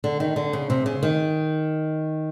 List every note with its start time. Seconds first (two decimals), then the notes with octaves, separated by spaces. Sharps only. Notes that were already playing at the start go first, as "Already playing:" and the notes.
0.04 D3
0.20 D#3
0.36 D3
0.53 C#3
0.70 C3
0.86 C#3
1.03 D#3